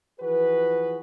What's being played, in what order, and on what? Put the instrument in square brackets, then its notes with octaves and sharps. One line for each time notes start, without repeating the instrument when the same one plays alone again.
[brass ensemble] E3 F3 F#4 G#4 B4